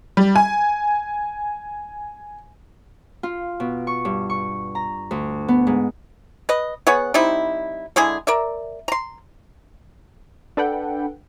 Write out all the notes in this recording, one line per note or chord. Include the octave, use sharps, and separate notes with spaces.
G3
G#5
F4
B2
C#6
G2
C#6
A#5
D2
B3
G#2
B4 D#5
B3 G#4 C#5 F#5
G3 C4 D#4 E4
D3 G#3 E4 G#4
A#4 D5 E5
A#5 C6
D4 A4 B4 F#5 G5